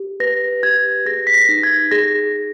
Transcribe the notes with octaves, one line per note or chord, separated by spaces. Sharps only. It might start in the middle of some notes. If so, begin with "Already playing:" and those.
Already playing: G4
B4 A#6
G4 G#6
G#4 A#6
B6
A#6
D#4
G#6
G#4 A#6